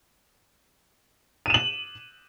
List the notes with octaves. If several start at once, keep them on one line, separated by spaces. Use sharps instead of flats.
D#7 E7 F#7